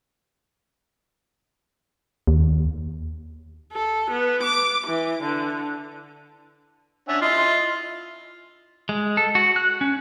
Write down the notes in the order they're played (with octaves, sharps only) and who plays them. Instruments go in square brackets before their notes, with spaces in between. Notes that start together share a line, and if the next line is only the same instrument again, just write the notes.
[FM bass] D#2
[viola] A4
B3
D6
E3
D3
[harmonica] C#4 D4 F#5 [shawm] E5
[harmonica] E4 D#5 C6 [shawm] F4
[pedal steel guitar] G#3
A4
F#4
F#6
C#4